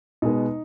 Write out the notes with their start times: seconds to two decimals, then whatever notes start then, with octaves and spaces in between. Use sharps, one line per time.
0.22 B2 G#3 B3 D#4